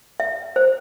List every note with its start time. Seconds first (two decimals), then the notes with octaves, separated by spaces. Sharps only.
0.20 E5
0.56 C5